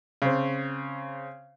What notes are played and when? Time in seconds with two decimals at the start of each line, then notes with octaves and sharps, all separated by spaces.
0.22 C#3 C4